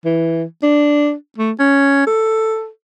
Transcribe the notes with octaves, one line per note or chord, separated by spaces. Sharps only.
E3
D4
A3
C#4
A4